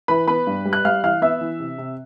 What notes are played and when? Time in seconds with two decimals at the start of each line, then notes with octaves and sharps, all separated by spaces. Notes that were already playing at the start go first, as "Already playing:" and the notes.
0.08 E3 B4 B5
0.27 B3 B4 B5
0.47 G2
0.65 G3
0.73 F#6
0.85 G3 F5 F6
1.04 E3 F5 F6
1.22 B3 E5 E6
1.41 E3
1.60 C3
1.78 C3